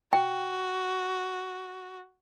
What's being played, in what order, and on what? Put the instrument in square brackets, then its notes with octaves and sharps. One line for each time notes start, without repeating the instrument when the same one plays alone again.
[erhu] F#4 [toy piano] G5